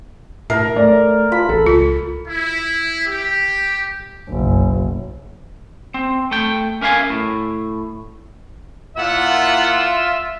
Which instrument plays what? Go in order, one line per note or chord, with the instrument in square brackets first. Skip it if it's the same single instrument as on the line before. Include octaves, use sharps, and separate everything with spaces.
[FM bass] A2 [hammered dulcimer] A#4 [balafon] E5
[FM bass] A3 [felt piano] D5
[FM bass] F4 [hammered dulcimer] B5
[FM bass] A1 [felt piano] A4
[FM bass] C#2 [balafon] F4
[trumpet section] E4
G4
[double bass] F#1 B1
[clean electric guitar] C4
A3 G5
C#4 A#4 E5 F5 G#5
A2
[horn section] A#2 E4 F#5 [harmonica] F4 E5